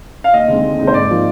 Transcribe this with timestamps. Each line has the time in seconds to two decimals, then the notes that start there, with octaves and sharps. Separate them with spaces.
0.24 F5
0.33 D#2 D#5
0.48 D3 G#3 C4 D#4
0.64 D#2
0.79 D3 G#3 C4 D#4
0.87 C5
0.94 G#2 D5
1.10 F3 A#3 D#4